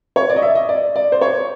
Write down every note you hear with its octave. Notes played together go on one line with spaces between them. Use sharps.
C#5
D5
D#5
E5
D#5
D5
D5
C5
C#5